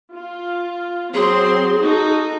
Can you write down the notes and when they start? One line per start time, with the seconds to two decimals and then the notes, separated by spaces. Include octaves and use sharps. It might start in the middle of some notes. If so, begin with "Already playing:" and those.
0.14 F4
1.14 F#3 C4 G#4 C6
1.82 D#4 F#4 A4